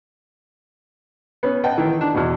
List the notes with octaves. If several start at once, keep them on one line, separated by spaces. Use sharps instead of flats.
B3 C#4
B4 D#5 F#5 G5 A5
D#3 E3
D4
E2 B2